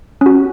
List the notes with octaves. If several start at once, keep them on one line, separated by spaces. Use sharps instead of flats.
C#4 F#4